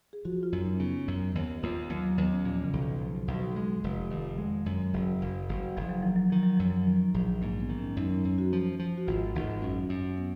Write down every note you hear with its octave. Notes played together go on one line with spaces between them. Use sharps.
G#4
F3 F#4
F4
F#2
D#4
C#4
C#3 B3
F#2
D#2 B3
D#2 F4
D#2 F#3
F#3
D#2 B3
C#4
A#2 F3
C#3
B1
D#3
F3
B1
G#3
F1
F2 D#3
G#3
F#2
F#1
F#1
F#1
F#1 F3
F#3
D#3 F3
F#3
D#3 F3
F#3
F#2 F3
F#3
D#3 F3
F#3
A#1 F3
G#2 A#3
B3
D#3
C#4
F#2 D#4
C#4
F#2 C#4
F#4
F3
F3
F#4
G#1 F4
G#1 D#4
F#2 C#4
F#2
B3